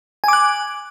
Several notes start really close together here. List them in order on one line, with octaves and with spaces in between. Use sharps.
G#5 D6 F#6